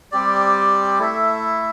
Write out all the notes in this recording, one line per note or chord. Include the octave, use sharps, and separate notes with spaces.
G3 C4 G4 D5
A3 E4 A4 E5